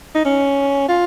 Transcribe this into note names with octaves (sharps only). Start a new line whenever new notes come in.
D#4
C#4
F4